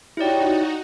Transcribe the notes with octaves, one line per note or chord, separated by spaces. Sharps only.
D#4 E4 F#4 G4 C#5 D5 G5